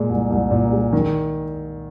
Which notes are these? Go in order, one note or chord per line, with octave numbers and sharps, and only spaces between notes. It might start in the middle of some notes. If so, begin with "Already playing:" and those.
Already playing: A#2 G#3
C2
C2
A#2
G#3
D#3